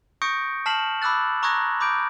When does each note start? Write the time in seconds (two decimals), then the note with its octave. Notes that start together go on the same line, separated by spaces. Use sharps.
0.22 C#6 D#6 G6 A#6 C#7 D7
0.66 A5 F6 B6 C7 E7 F#7
1.02 B5 D6 E6 F#6 A6
1.43 A#5 C#6 D#6 F#6 G#6 A#6
1.80 B5 D6 G6 D7